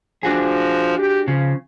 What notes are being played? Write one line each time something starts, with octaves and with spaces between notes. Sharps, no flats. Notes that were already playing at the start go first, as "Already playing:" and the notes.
F3 D4 F#4 G#4
G4
C#3 F3